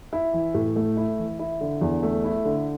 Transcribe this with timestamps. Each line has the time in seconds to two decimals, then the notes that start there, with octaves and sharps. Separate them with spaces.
0.13 E4
0.33 E3
0.54 A2
0.76 A3
0.97 E4
1.19 E3
1.39 E4
1.61 D3
1.81 E2
2.03 A3
2.24 E4
2.45 D3